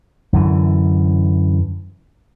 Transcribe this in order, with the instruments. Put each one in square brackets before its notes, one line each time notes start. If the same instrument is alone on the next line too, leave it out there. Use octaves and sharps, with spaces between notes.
[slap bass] F#2 D3 E3